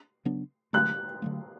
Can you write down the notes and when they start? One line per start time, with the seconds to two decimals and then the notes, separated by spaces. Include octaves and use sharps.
0.25 C#3 F#3 B3 D4
0.73 D3 F#3 A3 F#6
1.22 D3 F#3 A3